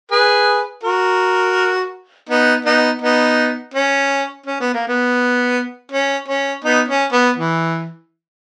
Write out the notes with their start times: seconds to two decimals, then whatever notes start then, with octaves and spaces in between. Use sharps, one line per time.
0.12 G#4 B4
0.83 F#4 A#4
2.29 B3 D#4
2.65 B3 D#4
3.02 B3 D#4
3.74 C#4
4.47 C#4
4.60 B3
4.74 A#3
4.88 B3
5.92 C#4
6.28 C#4
6.64 B3 D#4
6.88 C#4
7.12 B3
7.37 E3